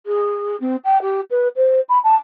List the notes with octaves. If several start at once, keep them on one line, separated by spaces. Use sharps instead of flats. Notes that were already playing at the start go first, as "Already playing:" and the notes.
G#4
C4
G5
G4
B4
C5
B5
A5